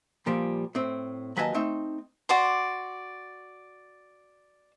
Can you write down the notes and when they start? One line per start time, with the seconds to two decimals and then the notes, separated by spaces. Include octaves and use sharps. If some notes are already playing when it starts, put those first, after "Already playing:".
0.26 A#2 F3 G3 A#3
0.75 A2 C4
1.37 D#2 F#3 B4 D#5 G#5 A5
1.54 A3 C4 D#4
2.29 F#4 D5 C6